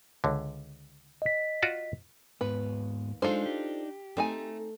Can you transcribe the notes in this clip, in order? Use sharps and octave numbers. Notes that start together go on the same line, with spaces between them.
C#2 D3
D#5 B6
F4 F#4 D5
D#2 G#2 B3 B4
G#3 D4 D#4 F4 G#4 A4 C5
G4
A3 C4 D#4 G#5